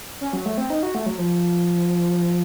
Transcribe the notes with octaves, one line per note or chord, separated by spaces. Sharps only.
C#4
F#3
A3
C4
D#4
F#4
A3
F#3
F3